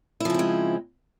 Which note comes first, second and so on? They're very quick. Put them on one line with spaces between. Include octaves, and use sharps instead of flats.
E4 F3 C#3 C4 G#3